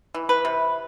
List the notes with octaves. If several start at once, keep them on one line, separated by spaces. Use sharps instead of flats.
E3
B4
C3